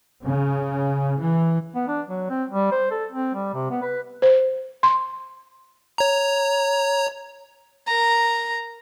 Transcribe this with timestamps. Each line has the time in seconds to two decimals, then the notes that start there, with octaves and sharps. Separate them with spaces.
0.25 C#3
1.19 E3
1.75 B3
1.88 D4
2.09 F#3
2.30 C4
2.50 G3
2.72 C5
2.91 A4
3.12 C4
3.34 G3
3.54 C3
3.70 B3
3.82 B4
4.22 C5
4.83 C6
5.98 C#5 A#5
7.87 A#4 A#5